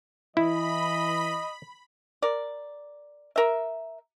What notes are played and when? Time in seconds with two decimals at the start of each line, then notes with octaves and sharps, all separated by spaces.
0.37 E3 E4 D#5 B5
2.22 A#4 D5
3.36 A#4 E5